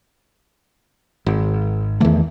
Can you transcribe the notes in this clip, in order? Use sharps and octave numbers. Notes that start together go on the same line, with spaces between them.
G#1
E2 D#3 E3 A3